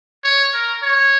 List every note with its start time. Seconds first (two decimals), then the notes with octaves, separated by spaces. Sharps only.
0.24 C#5
0.53 A#4
0.83 C#5